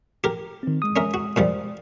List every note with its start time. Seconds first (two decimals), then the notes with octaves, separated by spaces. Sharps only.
0.24 G4 A#4
0.63 D#3 C4
0.82 G#3 D#6
0.96 C#4 A#4 E5
1.14 F#4
1.36 A#2 F3 G3